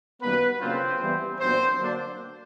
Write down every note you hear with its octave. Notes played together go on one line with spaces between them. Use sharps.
F#2 D#3 G3 A#3 B3 B4
C#3 F#3 A#3 C4 D4 F4 C5
E3 G3 B3 E4
A#2 F#3 B3 C4 D4 C5
D3 F#3 A#3 D4